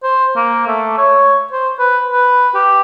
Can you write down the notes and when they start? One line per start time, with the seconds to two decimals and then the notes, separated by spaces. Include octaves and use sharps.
0.03 C5
0.36 A#3
0.67 A3
0.98 C#5
1.52 C5
1.79 B4
2.10 B4
2.55 G4